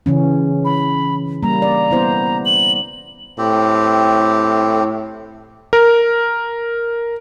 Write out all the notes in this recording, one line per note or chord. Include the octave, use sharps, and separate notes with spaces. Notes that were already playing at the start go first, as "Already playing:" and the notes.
C#3 E3 C#4
B5
G3 A#3 A#5
D5
B3 E4 C5
F#7
A2 C4 G4
A#4